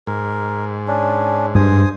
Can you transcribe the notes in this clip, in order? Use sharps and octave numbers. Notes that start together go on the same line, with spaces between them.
G#2 A#4
C#4 D4
G2 C5 G#5 D#6